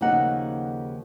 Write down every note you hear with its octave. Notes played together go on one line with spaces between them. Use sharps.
D#2 C#3 F3 A#3 D#4 F#5